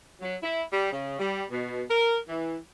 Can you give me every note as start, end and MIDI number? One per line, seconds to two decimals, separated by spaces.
0.21 0.35 54
0.43 0.63 64
0.73 0.89 55
0.92 1.18 49
1.19 1.44 55
1.51 1.83 47
1.89 2.15 70
2.28 2.56 52